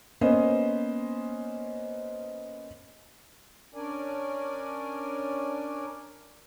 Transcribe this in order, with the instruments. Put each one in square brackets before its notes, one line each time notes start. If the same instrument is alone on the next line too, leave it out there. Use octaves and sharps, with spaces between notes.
[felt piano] A#3 B3 C#4 C5 D#5
[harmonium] C#4 D4 A#4 D5 G#5